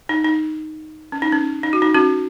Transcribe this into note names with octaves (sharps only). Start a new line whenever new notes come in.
D#4
D#4
C#4
D#4
C#4
D#4
F#4
D#4
C#4 F#4